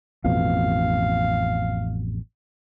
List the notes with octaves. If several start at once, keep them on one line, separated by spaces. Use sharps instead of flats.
A1 F2 B2 F5